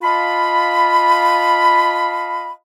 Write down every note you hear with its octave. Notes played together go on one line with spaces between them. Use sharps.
F4 D#5 F5 A5 B5